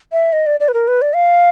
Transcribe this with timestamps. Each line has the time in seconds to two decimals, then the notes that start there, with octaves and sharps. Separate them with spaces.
0.12 E5
0.33 D#5
0.46 D5
0.60 D5
0.68 B4
0.74 A#4
0.88 B4
1.02 D5
1.15 F5